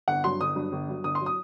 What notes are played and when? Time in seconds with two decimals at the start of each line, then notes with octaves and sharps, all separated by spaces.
0.08 G1 F#5
0.24 G2 F#3 C6
0.40 G1 D#6
0.56 G2 F#3
0.72 G1
0.88 G2 F#3
1.04 G1 D#6
1.15 C6
1.21 F#3
1.26 D#6